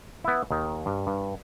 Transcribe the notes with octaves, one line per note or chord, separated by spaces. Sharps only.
B3 E4
D#2 D#3
G2
G2